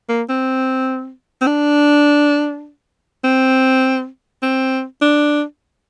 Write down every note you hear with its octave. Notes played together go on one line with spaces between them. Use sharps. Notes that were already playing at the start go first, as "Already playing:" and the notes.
A#3
C4
C4
D4
C4
C4
D4